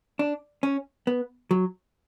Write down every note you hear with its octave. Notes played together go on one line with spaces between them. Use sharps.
D4
C#4
B3
F#3